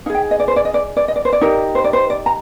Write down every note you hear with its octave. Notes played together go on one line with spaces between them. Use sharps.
D#4 G#4 F5 G5
D#5
D5
C5
D5
D#5
D5
D5
D#5
D5
C5
D5
D#4 G4 A#4
C5
D5
C5
D5
A#5